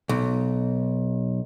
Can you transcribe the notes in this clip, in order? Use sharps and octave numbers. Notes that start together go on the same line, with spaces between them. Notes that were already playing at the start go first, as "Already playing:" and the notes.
B1